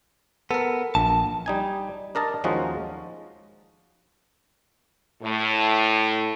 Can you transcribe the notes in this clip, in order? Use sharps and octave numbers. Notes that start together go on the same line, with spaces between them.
B3 A4 A#4
A#1 A5
G3 D#4 G#5
D4 A#4 D#5 A5
D#2 F3 G#3 C#4 D#4 F#4
A2